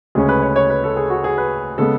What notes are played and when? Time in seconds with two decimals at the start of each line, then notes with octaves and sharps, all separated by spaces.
0.15 D2 C#3 G#3 C#4 G#4
0.29 B4
0.42 C#5
0.56 C#5
0.70 B4
0.84 A4
0.97 G#4
1.10 F#4
1.24 G#4
1.38 B4
1.78 C#3 G#3 B3 A4